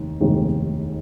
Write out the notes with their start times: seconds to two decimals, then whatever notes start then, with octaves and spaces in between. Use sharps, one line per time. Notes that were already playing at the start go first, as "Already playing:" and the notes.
Already playing: F1 D#2 D#3
0.21 F1 D#2 D#3 G#3